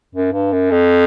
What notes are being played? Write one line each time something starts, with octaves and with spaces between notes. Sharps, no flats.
F#2
G2
F#2
F2